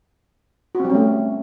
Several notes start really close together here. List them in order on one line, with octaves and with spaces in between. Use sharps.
F#4 C4 G3 C#4 A3